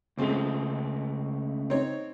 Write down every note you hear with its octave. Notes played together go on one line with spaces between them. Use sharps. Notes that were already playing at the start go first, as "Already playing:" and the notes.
C#2 C#3 G#3 A3 C4 C#4
C4 D#4 C#5